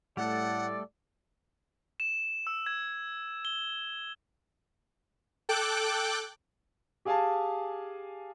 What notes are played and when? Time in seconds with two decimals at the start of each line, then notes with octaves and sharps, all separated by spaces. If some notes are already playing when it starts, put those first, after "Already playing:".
0.17 A2 G3 A3 A4 D5 F#5
2.00 E7
2.47 E6
2.66 G#6
3.45 G7
5.49 A4 G5 D6 F#6
7.05 G4 G#4 F5 G#5 A5